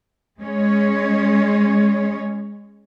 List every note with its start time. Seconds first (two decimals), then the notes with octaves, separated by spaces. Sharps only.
0.40 G#3 C#4 C#5